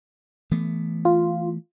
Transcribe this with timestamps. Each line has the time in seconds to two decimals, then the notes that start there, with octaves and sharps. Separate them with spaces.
0.51 E3 A3 B3
1.05 F4